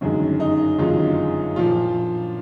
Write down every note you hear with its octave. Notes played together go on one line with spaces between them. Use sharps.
G1 F#2 D#3 G#3
D#4
G1 F#2 D#3 G#3 F4
A#2 F3 F4